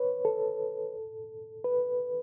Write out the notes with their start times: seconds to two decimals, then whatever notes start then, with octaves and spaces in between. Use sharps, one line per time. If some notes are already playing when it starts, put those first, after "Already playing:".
Already playing: B4 C#5
0.25 A4
1.64 B4